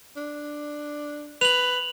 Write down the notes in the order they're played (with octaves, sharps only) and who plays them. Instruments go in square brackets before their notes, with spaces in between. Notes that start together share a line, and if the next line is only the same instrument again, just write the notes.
[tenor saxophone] D4
[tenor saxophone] B4 [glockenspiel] F7 F#7